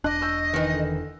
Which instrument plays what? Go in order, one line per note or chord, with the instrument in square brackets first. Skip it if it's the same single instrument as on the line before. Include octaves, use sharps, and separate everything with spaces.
[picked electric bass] E1 D4 [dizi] D#5 [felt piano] D6 F#6
[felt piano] C#6 E6 G6
[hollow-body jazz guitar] D#3 E3
[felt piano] D3